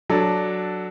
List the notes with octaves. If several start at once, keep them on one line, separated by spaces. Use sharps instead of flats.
F#3 D4 A4